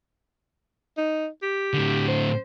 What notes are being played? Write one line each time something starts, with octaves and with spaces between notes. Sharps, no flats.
D#4
G4
A2 D3
C5